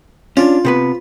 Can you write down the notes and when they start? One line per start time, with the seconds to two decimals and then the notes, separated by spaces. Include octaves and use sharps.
0.37 C#4 D4 F4
0.65 C3 B3 B4